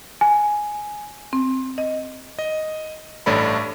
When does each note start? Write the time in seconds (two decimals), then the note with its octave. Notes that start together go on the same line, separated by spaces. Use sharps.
0.21 G#5
1.33 C4
1.78 D#5
2.39 D#5
3.26 A1 G2 A3 C#5 D5 B5